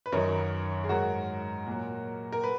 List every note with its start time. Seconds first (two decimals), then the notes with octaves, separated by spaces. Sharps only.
0.06 B4
0.12 F#2 D#3 F#3 A#4 C#5
0.84 G#4
0.89 G#2 F#3 F#4 A#4
1.67 A#2 F#3
2.32 A#4
2.44 B4